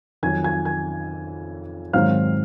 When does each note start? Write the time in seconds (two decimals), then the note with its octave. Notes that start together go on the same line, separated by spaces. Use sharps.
0.23 F2 D#3 F#3 G#5 G#6
0.44 G#5 G#6
0.65 G#5 G#6
1.93 G#2 D#3 F#3 C4 F5 F6